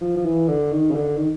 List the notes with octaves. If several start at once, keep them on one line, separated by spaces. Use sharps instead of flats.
F3
F3
E3
D3
D#3
C#3
D3
D#3